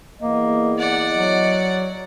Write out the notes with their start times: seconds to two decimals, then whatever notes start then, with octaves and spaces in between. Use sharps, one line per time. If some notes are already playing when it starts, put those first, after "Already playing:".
0.22 E2 A#3 D#5
0.78 D5 F#5
1.12 F#3